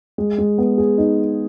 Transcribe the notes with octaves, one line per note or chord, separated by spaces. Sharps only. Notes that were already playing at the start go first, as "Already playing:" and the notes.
G#3
G#3
B3
G#4
D#4